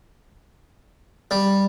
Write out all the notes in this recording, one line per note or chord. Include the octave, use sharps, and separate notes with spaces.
G3